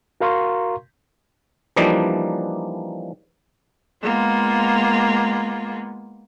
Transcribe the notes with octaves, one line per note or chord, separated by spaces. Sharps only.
F#4 A#4 F5 A#5 C6 C#6
E3 F3 G3 A#3 D4 D#4
G#3 A#3 B3 F4